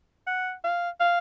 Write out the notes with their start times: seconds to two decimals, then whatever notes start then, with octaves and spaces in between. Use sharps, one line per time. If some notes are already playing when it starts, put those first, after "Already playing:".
0.27 F#5
0.64 F5
1.00 F5